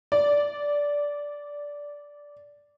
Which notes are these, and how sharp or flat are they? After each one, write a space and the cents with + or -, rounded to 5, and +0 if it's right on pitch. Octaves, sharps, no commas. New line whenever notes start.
D5 -10